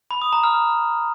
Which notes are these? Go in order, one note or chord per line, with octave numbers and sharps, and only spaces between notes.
B5
D#6
A#5
F6